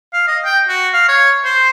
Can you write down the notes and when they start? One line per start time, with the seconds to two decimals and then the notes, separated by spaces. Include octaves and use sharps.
0.13 F5
0.27 D#5
0.45 G5
0.68 F#4
0.93 F5
1.08 C#5
1.45 C5